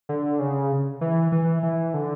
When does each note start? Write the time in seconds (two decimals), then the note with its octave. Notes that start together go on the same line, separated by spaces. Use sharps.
0.09 D3
0.40 C#3
1.01 E3
1.32 E3
1.63 E3
1.94 D3